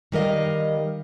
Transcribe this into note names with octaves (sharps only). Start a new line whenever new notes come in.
D#3 G3 A#4 D#5 F5